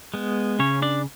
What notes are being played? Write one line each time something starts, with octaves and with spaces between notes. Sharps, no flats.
G#3 B3
C#3 C#4 C#5
D4 D5